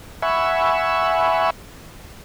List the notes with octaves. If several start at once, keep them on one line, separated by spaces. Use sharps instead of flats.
E5 F#5 G#5 B5 C#6 E6